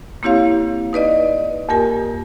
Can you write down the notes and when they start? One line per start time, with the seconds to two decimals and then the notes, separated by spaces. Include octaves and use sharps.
0.23 A#3 C4 E4 G4 C#5 F5
0.93 D#4 B4 D5 D#5
1.69 F2 A#3 G4 A#4 G#5